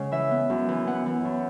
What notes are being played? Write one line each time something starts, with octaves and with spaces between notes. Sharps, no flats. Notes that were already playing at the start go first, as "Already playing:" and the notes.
Already playing: C#3 G#3 C#4 F#5
E3 E5
B3
F#2
E3
B3 F#5
E3
F#2